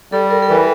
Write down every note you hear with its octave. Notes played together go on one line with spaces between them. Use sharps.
G3 A4
A#4
A4
E3 A#4